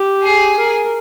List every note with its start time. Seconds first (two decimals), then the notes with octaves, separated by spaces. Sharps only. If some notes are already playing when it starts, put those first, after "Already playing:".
Already playing: G4
0.23 G#4
0.56 A#4